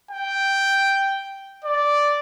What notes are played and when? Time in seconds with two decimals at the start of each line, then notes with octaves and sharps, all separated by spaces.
0.11 G5
1.64 D5